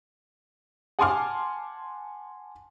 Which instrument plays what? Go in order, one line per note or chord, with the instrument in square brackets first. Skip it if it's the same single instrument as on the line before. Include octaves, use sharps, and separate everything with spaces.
[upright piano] F#5 G#5 A5 C6 D6 F6